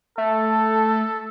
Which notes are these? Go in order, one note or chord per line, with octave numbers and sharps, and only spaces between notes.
A3 A4